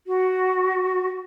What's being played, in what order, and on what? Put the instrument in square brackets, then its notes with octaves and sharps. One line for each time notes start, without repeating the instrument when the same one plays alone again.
[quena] F#4